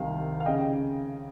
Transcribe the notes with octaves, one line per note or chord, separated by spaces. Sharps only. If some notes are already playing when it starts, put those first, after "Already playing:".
Already playing: C2 C3 D#3 F5
F5
C#3 D#5 G5